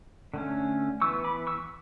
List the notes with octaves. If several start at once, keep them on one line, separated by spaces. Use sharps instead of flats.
D3 A3 C#4
E3 B3 C#6 E6
B5 D6
C#6 E6